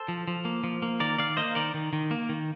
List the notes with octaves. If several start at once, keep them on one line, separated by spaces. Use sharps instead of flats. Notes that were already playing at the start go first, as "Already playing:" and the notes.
Already playing: A4 C5
F3
F3
A#3
F3
A#3
D#3 A#4 D5
D#3 D5 F5
A#3 C5 D#5
D#3 A#4 D5
D#3
D#3
A#3
D#3